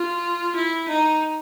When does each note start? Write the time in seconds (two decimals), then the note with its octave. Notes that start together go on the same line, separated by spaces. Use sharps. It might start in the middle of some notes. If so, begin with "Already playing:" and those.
Already playing: F4
0.56 E4
0.88 D#4